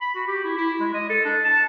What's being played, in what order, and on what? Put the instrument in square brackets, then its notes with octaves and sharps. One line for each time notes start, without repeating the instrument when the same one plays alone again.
[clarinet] B5
F#4
G4
E4
E4
G#3
D#5
A4
D4
A5